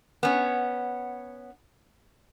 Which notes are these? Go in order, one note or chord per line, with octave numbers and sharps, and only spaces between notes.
B3 C#4